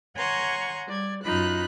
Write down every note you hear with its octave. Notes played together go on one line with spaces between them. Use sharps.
C#5 F#5 G#5 A#5 C6 C#6
G3 D5 G#6
F#2 F#3 D#4 F4 B5 F#6